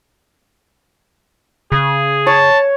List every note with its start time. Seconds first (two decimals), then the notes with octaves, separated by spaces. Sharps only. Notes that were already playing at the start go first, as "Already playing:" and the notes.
1.72 C#3 G#4
2.27 C#5 A5